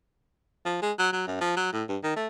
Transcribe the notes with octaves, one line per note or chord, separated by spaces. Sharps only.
F3
G#3
F#3
F#3
F#2
F3
F#3
A2
G2
D#3
A3